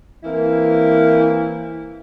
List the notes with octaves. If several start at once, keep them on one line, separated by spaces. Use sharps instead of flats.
E3 A#3 C4 E4